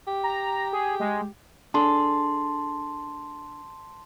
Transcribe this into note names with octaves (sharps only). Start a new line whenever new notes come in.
G4
A#5
G#4
G#3
D4 G#4 A4 A5 C6